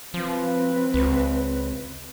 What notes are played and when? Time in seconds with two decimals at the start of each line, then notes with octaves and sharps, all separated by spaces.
0.14 F3 C4 B4
0.94 C#2